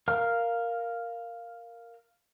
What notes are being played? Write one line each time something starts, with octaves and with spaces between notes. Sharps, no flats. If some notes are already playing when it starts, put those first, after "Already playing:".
A#4 F5 A#5 F6